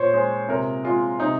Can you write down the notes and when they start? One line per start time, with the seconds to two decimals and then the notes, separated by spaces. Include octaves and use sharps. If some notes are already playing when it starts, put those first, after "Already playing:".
Already playing: A#2 C5 C#5
0.13 G#3 C5
0.48 C3 A#4
0.83 G#3 F4
1.19 C3 D#4